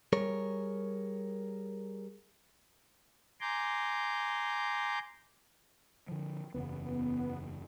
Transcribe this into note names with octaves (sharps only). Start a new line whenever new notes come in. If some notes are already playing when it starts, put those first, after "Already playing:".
G3 G#4 A#4 C#5
G#5 A#5 C6 D6 G6
D3 F3
F#1 E2 C#3 B3